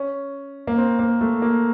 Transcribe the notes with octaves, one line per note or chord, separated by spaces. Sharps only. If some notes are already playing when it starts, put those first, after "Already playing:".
Already playing: C#4
A#3
C4
A#3
A3
A#3